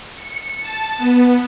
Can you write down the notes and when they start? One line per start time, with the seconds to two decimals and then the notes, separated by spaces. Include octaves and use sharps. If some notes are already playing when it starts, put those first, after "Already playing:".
0.16 C#7
0.60 A5
0.98 B3